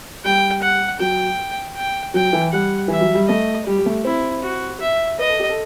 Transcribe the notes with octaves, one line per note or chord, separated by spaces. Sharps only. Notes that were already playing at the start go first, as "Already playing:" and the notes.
G3 G5
F#5
F#3 G5
G5
F#3 G5
E3
G3 F#5
E3 E5
F#3
G3
A3 D#5
G3 G4
G3
A3
C4 E4
F#4
E5
B4 D#5
A4
G4
A4